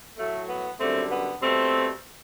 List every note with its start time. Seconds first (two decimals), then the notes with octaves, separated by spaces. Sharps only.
0.17 A2 F#3 A3
0.48 B3
0.79 F#2 D3 G3 A3 C4
1.11 B3
1.41 B2 G3 A3 C4